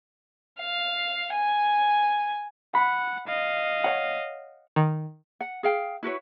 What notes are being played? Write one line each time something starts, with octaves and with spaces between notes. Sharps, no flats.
F5
G#5
F#5 B5
D#5 F5
C#5 F#5
D#3
F#5
G#4 F5 G5
E4 F#4 B4 C#5